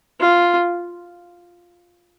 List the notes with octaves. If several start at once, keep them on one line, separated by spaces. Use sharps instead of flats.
F4